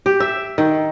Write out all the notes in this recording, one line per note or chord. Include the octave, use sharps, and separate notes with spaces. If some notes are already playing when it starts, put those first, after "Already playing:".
G4
E5
D#3